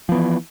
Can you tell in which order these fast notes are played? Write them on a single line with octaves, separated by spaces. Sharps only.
F3 B3 E3